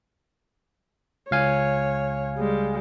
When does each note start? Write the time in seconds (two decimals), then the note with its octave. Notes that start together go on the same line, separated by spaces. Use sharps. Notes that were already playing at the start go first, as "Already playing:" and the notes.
1.31 C#2 C#5 F5 G#5
2.37 G3 G#3